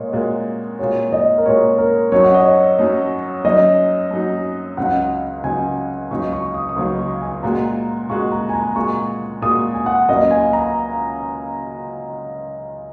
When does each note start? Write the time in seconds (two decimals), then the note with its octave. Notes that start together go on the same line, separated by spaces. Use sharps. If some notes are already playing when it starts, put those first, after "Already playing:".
Already playing: A#2 G#3 A#4 C#5 D#5
0.12 A#2 G#3 F#4 A#4
0.79 A#2 G#3 F#4 C#5
1.13 D#5
1.38 A#4
1.45 A#2 G#3 F#4 C#5
1.78 A#4
2.12 F#2 F#3 D#4 C#5
2.24 F#5
2.34 D#5
2.45 C#5
2.78 F#2 F#3 D#4
3.45 F#2 F#3 D#4 D#5
4.11 F#2 F#3 D#4
4.77 C#2 C#3 F#3 D#4 F#5
5.44 C#2 C#3 F#3 D#4 G#5
6.11 C#2 C#3 F#3 D#4 C#6
6.33 C#6
6.54 D#6
6.69 D#6
6.76 C#2 C#3 F#3 D#4 C#6
6.99 C#6
7.21 G#5
7.32 G#5
7.43 A#2 G#3 F#4 A#5
8.09 A#2 G#3 F#4 C#6
8.32 A#5
8.49 G#5
8.54 A#5
8.76 A#2 G#3 F#4 C#6
9.42 A#2 G#3 F#4 D#6
9.74 G#5
9.86 F#5
10.08 C#2 C#3 F#3 A#3 D#5
10.31 G#5
10.53 A#5